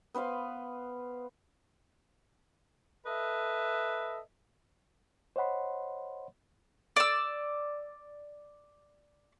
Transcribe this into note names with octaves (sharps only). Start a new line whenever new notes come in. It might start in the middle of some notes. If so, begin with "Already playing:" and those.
B3 B4 C5 F5
A4 B4 D#5 E5
C5 C#5 D#5 F#5 B5 C6
D5 E6